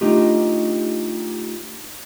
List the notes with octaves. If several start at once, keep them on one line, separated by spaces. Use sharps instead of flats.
A3 D4 D#4 F4 G4